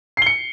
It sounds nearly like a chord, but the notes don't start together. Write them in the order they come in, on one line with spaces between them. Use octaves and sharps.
C7 G7 C#7